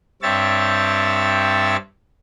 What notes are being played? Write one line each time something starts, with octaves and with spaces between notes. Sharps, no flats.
G2 C4 C#5 E5 A6